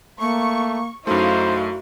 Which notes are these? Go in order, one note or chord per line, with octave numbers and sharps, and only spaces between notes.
A3 A#3 C#6
F#2 A3 D#4 E4 F#4 C5 F5